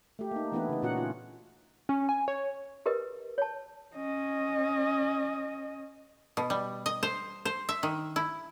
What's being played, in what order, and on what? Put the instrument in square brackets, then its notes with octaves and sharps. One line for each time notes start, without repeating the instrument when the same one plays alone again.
[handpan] A3 G4
A#3 D#4
E3 A3 B3 D4 E4 B4
C#3 D#4
A#2 C#4 F#4 F#5
F4
[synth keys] C#4
G#5
C#5
[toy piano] G4 A#4 B4 D#5
C#5 A5
[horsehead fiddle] C#4 D#5
[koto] B2
G3
D#5
C5
C5
E5
D#3
E4